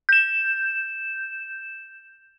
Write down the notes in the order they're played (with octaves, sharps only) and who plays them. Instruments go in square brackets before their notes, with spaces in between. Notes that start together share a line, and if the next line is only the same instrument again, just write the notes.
[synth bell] G6 E7